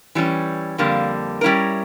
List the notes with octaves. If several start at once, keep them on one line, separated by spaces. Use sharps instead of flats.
E3 G3 C#4
F2 D3 G3 A#3
G3 C#4 E4 A#4